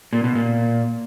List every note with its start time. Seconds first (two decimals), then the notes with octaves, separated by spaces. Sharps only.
0.13 A#2
0.24 B2
0.35 A#2